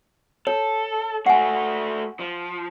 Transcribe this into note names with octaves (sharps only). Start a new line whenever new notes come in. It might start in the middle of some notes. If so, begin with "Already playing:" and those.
A4 C#5
A3 F#4 F#5 G#5
F3